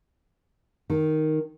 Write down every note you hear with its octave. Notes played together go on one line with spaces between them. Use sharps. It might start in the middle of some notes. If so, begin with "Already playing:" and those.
D#3